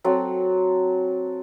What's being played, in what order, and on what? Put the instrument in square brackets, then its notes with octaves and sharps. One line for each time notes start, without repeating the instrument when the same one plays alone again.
[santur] F#3 C4 A4 F#5